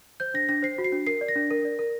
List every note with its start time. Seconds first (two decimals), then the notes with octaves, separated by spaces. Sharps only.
0.20 C5 G6
0.34 D4 A#6
0.49 D4 A#6
0.63 C5 C7
0.78 F#4
0.84 C7
0.92 D4
1.06 A#4 C7
1.21 D5
1.28 A#6
1.36 D4
1.51 A#4
1.65 D5
1.79 A#4